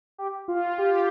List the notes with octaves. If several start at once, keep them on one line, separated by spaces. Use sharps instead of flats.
G4
F4
G4